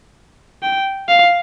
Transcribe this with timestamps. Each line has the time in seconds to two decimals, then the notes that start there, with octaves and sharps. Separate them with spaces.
0.63 G5
1.09 F5